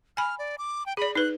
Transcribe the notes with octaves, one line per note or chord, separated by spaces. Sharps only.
G#5 B5 F6
D5
D6
G5
G#4 D5 B5
D#4 B4 F#6